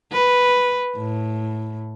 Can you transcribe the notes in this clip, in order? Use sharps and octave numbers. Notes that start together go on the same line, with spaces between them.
B4
A2